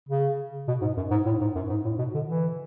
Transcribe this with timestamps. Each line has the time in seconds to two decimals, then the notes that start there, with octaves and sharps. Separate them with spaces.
0.09 C#3
0.68 B2
0.81 G#2
0.97 F#2
1.11 G#2
1.26 A2
1.41 G#2
1.55 F#2
1.70 G#2
1.85 A2
1.99 B2
2.14 D3
2.28 E3